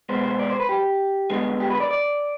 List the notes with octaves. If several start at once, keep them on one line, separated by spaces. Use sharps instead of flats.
B2 G#3 B3 C5
C5
D5
C5
B4
G4
G2 D3 G#3 B3
G4
B4
D5
D5